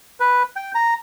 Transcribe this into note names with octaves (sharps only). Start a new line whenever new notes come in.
B4
G5
A#5